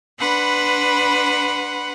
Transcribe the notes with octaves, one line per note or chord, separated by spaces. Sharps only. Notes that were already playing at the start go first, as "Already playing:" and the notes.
D4 B4 F#5 B5 C6